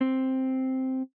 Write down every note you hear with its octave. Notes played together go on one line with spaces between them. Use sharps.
C4